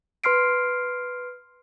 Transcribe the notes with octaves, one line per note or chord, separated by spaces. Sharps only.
B4 C6 F6 C7 D7